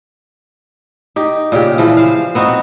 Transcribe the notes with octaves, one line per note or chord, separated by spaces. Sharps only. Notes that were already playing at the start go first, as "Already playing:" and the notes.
D#4 G4
A#2 C#3 G4 G5
C#3 E3 F3
C5 F5
B3 C4 D#4 F#4